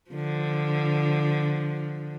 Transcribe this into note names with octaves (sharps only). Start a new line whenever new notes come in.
D3 F3